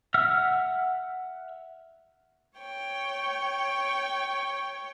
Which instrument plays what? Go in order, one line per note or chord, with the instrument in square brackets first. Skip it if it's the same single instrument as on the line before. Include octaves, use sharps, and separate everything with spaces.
[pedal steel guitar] E5 F#5 E6 F6
[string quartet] C#5 G5 C#6